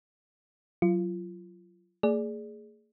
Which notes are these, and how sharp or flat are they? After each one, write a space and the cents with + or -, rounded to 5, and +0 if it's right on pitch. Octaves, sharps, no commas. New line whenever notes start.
F#3 -5 F4 -25
A#3 -45 G#4 +10 D5 +0